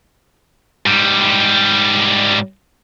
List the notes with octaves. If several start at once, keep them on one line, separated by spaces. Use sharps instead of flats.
G#2 G3